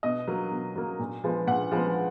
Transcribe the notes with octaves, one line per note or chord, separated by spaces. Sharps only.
B2 D#5
F#3 A#3
B2
F#3 A#3
A#2
F3 G#3 B3
A#2 F#5
F3 G#3 B3